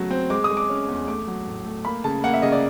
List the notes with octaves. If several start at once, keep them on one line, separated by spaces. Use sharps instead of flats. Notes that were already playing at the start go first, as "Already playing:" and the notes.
Already playing: C#3 F#3 A3 B3
C4
G#3 D6
D#6
G#3
D6
C#4
E2
A3 D6
F#3
A2
A3
A#3 B5
C#3 A5
A#3 F#5
E5
C#3 D#5
D5